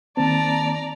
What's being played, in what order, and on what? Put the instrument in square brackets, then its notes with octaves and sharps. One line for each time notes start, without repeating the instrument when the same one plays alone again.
[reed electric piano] D#3 A#3 C4 [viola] D5 A#5 [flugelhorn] A5